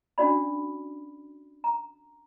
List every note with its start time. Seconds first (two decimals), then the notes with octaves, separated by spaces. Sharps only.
0.18 C#4 D4 F#4 D5 B5
1.64 A#5